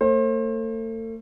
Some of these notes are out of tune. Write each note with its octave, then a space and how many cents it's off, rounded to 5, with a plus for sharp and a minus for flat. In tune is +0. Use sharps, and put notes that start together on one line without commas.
A3 +40 C5 +35